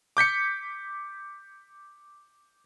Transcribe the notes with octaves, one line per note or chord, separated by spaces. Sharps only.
D6 G6 B6 C#7